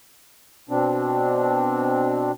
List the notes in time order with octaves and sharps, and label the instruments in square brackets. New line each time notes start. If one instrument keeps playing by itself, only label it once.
[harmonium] B2 C4 D4